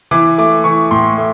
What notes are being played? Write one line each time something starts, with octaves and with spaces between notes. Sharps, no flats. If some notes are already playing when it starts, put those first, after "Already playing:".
E3 D6
A3 D6
E3 C#6
A2 C6
A3